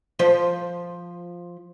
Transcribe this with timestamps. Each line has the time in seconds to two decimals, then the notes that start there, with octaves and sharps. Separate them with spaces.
0.19 F3 C5